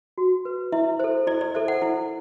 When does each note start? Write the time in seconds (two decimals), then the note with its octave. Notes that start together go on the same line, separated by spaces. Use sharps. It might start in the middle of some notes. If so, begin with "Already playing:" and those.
0.18 F#4
0.45 B4
0.72 E4 E5
0.99 A4 C5
1.27 E4 D5
1.41 D5
1.55 A4 C5 E5
1.68 F#5
1.82 E4 F#5